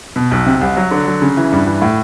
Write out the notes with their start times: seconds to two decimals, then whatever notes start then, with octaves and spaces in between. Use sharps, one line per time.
0.16 B2
0.31 B1
0.46 C3
0.61 C2
0.77 F#3
0.91 D3
1.07 F#3
1.22 C#3
1.37 E3
1.52 G2
1.67 E3
1.82 A2